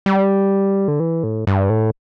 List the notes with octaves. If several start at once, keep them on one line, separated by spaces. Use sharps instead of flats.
G3
D3
E3
A2
G2
A2